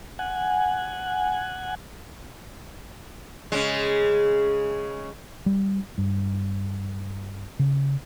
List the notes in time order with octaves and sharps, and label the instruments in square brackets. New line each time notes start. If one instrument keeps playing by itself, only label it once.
[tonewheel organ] F#5 G#5
[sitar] C#3 G#3
[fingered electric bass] G3
G2
C#3